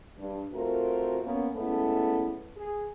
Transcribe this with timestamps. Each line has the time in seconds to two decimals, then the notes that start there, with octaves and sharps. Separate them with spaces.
0.19 G2
0.53 A3 C4 F4 F#4 A#4
1.24 A#3 B3 C#4
1.56 G#3 A3 B3 C#4 E4 A4
2.56 G#4